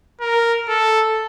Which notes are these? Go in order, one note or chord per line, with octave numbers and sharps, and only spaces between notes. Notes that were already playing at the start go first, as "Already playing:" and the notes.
A#4
A4